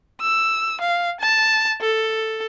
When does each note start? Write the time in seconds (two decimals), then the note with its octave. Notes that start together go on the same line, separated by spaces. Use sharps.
0.21 E6
0.81 F5
1.20 A5
1.81 A4